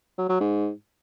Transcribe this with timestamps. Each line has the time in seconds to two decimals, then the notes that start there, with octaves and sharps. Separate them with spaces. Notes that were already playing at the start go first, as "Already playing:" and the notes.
0.18 F#3
0.29 F#3
0.40 G#2